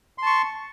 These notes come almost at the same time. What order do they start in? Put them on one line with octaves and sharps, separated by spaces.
C6 A5 C#6